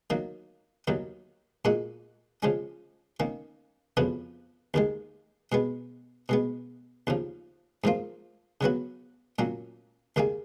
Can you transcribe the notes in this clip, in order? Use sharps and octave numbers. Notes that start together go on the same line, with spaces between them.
D#3 F#3 A#3
D#2 D#3 F#3
A#2 G#3 D#4 F#4
C#3 F3 G#3 C#4
D#3 A#3 C#4
F2 C#3 F3 B3 F#4
D#2 D#3 G#3
B2 G#3 B3
B2 G#3 B3
D#2 C#3 F3
G#2 F3 A#3 F4
C#3 F#3 B3 F#4
A#2 F#3 A#3 C#4
D#2 D#3 A#3 D#4 G#4